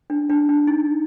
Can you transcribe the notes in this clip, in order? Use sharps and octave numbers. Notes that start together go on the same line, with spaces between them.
D4
D4
D4
D#4